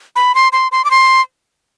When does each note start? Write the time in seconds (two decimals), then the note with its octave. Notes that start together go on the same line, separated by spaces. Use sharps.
0.16 B5
0.35 C6
0.52 C6
0.72 C6
0.85 D6
0.91 C6